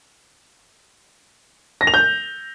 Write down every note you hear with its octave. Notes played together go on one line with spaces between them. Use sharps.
A#6
F7
G6